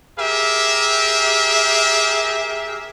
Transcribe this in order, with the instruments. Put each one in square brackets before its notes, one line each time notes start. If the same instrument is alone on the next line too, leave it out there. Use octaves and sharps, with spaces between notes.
[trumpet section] G4 G#4 A#4 E5